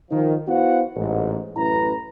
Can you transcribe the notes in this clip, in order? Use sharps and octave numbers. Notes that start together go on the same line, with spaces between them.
D#3 F3
B3 E4 F#4 C5 F5 F#5
A1 G#2
A1 F#2 E4 B4 A#5